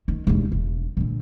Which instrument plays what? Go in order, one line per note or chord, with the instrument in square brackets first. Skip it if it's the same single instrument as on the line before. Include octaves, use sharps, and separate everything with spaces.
[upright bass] D#3
E1 D#2
E1
A#2 D3